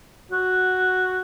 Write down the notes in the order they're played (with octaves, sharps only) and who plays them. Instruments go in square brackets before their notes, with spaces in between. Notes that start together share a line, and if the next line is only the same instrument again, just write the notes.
[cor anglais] F#4